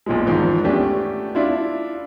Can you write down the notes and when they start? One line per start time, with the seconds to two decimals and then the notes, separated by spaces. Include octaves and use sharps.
0.06 B1 A#2 F3 G#3
0.27 E2 G#2 D#3 F3
0.64 A3 B3 C#4 D4 G4
1.35 D4 E4 F4